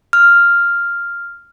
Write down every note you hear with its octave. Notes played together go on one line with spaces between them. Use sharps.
F6